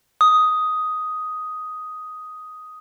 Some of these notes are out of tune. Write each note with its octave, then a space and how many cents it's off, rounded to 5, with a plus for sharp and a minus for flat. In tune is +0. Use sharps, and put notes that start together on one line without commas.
D#6 +5